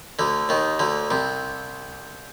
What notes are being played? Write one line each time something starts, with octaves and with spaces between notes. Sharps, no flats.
D2 D3
D#2 D#3
D2 D3
C2 C3